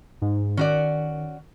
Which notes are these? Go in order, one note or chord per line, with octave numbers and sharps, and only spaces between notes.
G#2
D#3 C#4 F#4 D5